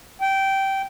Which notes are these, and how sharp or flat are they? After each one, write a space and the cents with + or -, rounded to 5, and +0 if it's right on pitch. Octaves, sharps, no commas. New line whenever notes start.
G5 -15